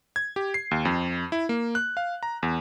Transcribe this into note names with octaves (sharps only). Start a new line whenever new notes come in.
G#6
G4
C7
D#2
F2
E4
A#3
F#6
F5
A#5
E2